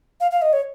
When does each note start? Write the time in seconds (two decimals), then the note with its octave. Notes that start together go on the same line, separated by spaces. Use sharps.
0.20 F5
0.31 F5
0.42 D#5
0.53 C#5